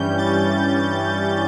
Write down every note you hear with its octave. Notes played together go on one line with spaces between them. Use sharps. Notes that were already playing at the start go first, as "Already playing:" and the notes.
Already playing: G2 E3 G3 C#4 G6
A6